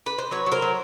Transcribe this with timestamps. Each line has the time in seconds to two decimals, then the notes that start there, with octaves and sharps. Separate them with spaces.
0.06 B4
0.18 C5
0.31 F#3 B4 C#5
0.46 F#3
0.52 A#4 C5
0.62 F#3